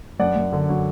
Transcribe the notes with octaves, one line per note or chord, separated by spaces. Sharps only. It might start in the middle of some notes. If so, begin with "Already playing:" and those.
F#2 D5 F#5
F#2
D3
F#3